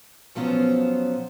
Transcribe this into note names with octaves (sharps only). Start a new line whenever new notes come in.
B2 F3 F#3 B3 C#4 C5